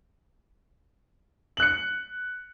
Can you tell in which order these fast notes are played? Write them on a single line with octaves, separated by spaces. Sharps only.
F#7 F#6 C#7